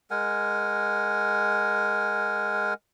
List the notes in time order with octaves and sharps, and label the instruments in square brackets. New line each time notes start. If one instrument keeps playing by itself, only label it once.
[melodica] G#3 A#4 F#5 G#5